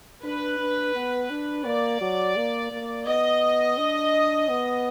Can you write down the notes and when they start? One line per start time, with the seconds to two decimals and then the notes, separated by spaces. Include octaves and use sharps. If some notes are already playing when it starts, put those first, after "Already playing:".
0.24 D4 B4
0.59 D4
0.95 B3
1.30 D4
1.66 A#3 D5
2.01 F#3
2.36 A#3
2.72 A#3
3.07 B3 D#5
3.78 D4
4.49 B3